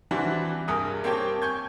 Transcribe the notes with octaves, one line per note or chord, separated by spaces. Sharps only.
E3 G3 C4 D4 F#4
C2 G2 G#4 A#4 D#6
A#3 C4 G4 C#5 G5 A5
G#5 C#6 G6 G#6